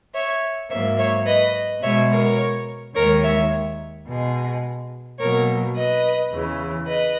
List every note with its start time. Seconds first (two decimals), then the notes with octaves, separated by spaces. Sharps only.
0.13 C#5 E5
0.69 G#2 F#3 A#3 C#5 E5
0.97 C#5 E5
1.26 B4 D#5
1.82 B2 G#3 C#5 E5
2.10 A#4 C#5
2.95 D#2 D#3 G#3 A#4 C#5
3.22 C#5 E5
4.06 B2 G#3
5.18 B2 F#3 A#3 A#4 C#5
5.75 B4 D#5
6.32 E2 C#3 E3
6.87 B4 D#5